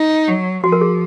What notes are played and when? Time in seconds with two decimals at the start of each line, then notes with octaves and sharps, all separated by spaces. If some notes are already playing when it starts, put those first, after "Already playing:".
Already playing: D#4
0.28 F#3
0.64 F3 F#4
0.72 A#4
0.81 G#4